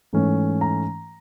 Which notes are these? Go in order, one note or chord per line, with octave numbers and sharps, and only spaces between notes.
G#2 E3 A3 C#4
A#5